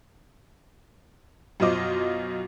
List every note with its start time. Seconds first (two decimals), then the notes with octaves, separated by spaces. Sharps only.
1.60 F#2 B2 F4 C5 D#5 D6